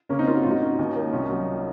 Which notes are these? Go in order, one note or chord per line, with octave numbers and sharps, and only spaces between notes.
C#3 A#3 C#4
C4 D#4
A#3 C#4 F4
F#4
G#2 F4
D#4 F#4
C#4
D#2
A#3
C2 C#4 F4
F#3